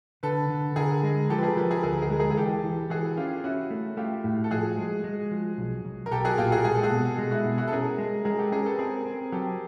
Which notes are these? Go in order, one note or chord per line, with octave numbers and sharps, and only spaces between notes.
D3 A4 B4
D3
D3 G#4 A#4
G#3
F3 G4 A4
B4
G#4 A#4
F3 A4 B4
G#4 A#4
D2 G#4 A#4
G#4 A#4
G#3
G#4 A#4
G#4
E3 G4 A4
E3
E3 F#4 G#4
C#4 F4 G4
C#4 E4 F#4
A3
A3 F4 G4
A2
A4
F3 F#4 G#4
G#3
G#3
F3
B1
B1
A#4
B1 G4 A4
F#4 G#4
A#2 F4 G4
F#4 G#4
G#3 G#4
A4
F#4 G#4
B2
G#3
E4 F#4
B2
E4 F#4
A4
C#4 G#4 A#4
G#3
G#3 G#4 A#4
G4 A4
C#4 G#4 A#4
A4 B4
C4 G#4 A#4
C4
F#3 G4 A4